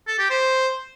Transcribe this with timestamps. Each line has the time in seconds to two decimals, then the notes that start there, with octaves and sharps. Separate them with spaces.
0.07 A4
0.19 G4
0.30 C5